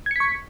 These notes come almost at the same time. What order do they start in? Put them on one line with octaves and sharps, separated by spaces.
G#6 C#7 B6 C#6